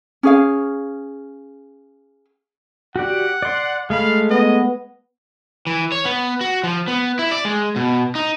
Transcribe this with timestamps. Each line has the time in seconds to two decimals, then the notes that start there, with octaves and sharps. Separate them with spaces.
0.23 C#4 G#4 F5
2.96 F#4 G4 D5 F#5
3.42 D5 C6
3.90 G#3 A3 F5 B5
4.30 B3 D#5
5.67 E3
5.92 C#5
6.05 B3
6.41 F#4
6.64 F3
6.88 B3
7.19 E4
7.31 D5
7.45 G#3
7.76 B2
8.15 D#4